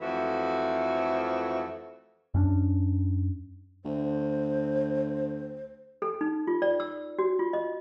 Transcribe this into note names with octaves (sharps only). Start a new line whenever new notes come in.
F2 E3 F3 A3 F#4
F#2 C#4 D4
D2 C5
A4
D#4
F4
D5
E6
F#4
F4
D#5